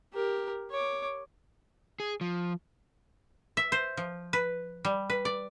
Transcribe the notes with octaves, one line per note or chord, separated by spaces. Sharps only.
G4 A#4
C#5 D6
G#4
F3
E5
C5
F3
B4
G3
B4
D5